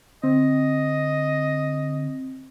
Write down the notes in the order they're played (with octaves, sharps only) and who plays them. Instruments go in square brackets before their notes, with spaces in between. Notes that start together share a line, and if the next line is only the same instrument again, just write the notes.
[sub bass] D3 [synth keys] C4 [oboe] D#5